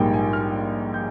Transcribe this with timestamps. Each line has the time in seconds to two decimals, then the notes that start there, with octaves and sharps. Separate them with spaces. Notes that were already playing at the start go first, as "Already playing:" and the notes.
Already playing: A#1 G#2 G3 A#3 G5
0.13 G#5
0.33 F6
0.94 G6